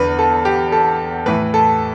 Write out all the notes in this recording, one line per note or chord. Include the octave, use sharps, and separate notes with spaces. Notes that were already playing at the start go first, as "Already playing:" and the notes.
Already playing: E2 D3 B4
A4
G4
A4
A2 E3 B4
A4